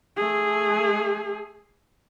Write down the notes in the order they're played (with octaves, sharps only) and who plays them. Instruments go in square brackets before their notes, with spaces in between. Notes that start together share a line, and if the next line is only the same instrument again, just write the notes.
[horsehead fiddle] A3 G#4